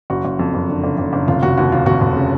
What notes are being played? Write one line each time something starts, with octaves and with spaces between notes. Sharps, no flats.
F#1 F#4
F#1
F2
F#1
D3
F#1
F#1
F#1
F1 F4
F1 F#4
D#2 F#4
D#2 F4
F1 F#4
F1
C#3